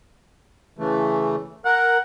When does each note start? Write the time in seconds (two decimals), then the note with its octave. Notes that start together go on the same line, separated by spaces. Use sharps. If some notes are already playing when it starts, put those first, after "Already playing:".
0.78 C#3 E3 A3
1.65 A#4 F#5